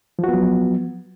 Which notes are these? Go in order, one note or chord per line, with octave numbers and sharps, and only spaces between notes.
F3 F#3 B3 F#4